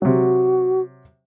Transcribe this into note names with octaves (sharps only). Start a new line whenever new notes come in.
C3 F#3 F#4